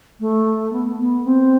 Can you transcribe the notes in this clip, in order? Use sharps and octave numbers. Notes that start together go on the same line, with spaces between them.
A3
B3
B3
C4